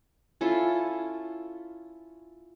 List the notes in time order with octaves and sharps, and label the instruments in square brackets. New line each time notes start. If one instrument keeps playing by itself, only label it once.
[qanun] C#4 E4 F4 A4